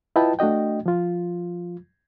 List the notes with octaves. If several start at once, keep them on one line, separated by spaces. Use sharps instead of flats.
E4 F4 B4 D#5 G5 A5
A3 D4 F#4 D#5 G5
F3 F4